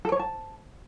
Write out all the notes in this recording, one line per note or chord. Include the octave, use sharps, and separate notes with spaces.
A4
C#5
A5